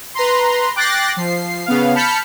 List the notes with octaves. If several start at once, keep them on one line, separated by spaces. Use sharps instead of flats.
B4 A#5 C6
G5 D6 F#6 A6 A#6 C7
F3 C7
C#3 B3 F5
A5 B5 F6 G6 B6 C#7